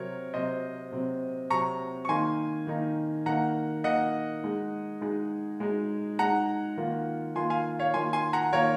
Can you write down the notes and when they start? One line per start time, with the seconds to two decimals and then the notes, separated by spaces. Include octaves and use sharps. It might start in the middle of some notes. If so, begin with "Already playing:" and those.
Already playing: C3 F#3 C4 A#4 C#5
0.34 C3 F#3 C4 C5 D#5
0.92 C3 F#3 C4
1.50 C3 F#3 C4 A#5 C#6
2.05 C#6
2.09 D#3 A#3 D#4 G#5 C6
2.67 D#3 A#3 D#4
3.26 D#3 A#3 D#4 F#5 A#5
3.84 D#3 A#3 D#4 D#5 F#5
4.44 G#3 D#4 G#4
5.01 G#3 D#4 G#4
5.60 G#3 D#4 G#4
6.19 G#3 D#4 G#4 F#5 A#5
6.77 D#3 A#3 F4
7.36 D#3 A#3 F4 G#5 C6
7.50 F5 G#5
7.79 C#5 F5
7.94 D#3 A#3 F4 G#5 C6
8.13 G#5 C6
8.33 F#5 A#5
8.53 D#3 A#3 F4 A#4 C#5